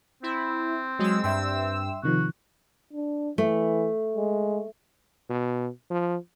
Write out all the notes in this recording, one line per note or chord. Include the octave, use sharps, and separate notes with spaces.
C4 E4
F#3 G#3 E6
G2 E5 G5 C6 E6
C3 D#3 F3 F#4
D4
E3 A3
G#3
B2
F3